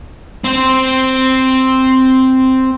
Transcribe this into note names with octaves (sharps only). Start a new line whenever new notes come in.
C4 C5